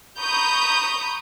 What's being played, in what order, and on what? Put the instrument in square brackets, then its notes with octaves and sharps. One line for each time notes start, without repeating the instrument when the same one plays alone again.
[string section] A#5 B5 C#6 D#6 G6